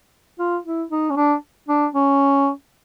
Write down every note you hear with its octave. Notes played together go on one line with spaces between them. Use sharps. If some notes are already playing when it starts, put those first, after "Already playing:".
F4
E4
D#4
C#4
D4
D4
C#4